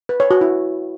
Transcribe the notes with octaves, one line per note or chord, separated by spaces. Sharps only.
B4
C#5
F#4
E4